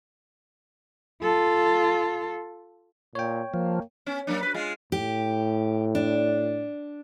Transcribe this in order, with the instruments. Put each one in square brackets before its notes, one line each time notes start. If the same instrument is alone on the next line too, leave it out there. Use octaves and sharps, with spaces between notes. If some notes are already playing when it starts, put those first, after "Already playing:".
[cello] F4 A4
[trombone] A#2 [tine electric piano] C#5 G5
[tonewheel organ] F3 [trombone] A#3
[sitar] B3 C#4
F#3 A#3 D4
F#4 B4
G#3 F4 G#4
[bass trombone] A2 [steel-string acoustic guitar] G4
[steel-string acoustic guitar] D4